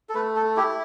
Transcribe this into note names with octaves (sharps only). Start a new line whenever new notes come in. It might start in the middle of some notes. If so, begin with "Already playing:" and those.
A4
A3 B4
A4
E4 G4